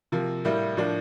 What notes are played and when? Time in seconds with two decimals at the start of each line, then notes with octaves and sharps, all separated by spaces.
0.12 C3 F3 A#3
0.44 A2 G3 A#3 E4
0.77 A2 F3 A#3 D4